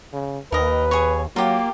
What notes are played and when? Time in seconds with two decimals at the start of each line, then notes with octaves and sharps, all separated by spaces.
0.13 C#3
0.52 D#2 A#4 B4 D#5
0.91 G#4 C#5
1.36 F#3 A#3 F4 G4